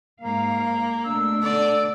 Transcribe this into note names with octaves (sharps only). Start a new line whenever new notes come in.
G#2 A#3 F5
B2 A3 D4 E6
D3 D5